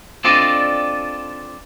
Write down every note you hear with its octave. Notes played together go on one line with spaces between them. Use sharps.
C4 D4 F4 A4 D5 D#5